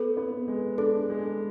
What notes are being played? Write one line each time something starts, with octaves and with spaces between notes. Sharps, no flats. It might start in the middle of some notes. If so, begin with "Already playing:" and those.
Already playing: B3 A4
B3
G#3
D4 A4
G#3